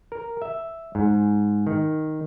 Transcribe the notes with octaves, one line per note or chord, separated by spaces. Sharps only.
A#4
E5
G#2
D#3